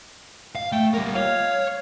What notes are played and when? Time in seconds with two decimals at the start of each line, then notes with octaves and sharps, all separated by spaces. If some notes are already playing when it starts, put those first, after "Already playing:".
0.55 F5
0.72 A3 G5
0.94 G3 A#3 A#4
1.15 C#5 F5